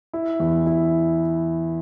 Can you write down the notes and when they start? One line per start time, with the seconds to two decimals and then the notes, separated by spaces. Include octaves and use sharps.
0.13 E4
0.40 E2
0.66 E4